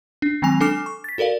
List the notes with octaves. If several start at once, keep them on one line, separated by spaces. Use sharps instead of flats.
D4
D#3 F#3 G#3 C4 G#5 F7
D4 A4 G#5 D6 F6 E7
C#6
A6 B6
F#4 A4 A#4 D5 F5